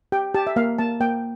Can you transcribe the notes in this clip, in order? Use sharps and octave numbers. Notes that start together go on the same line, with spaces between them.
G4 G5
G4 A5
E5
A#3 F5
A#3 A5
A#3 G5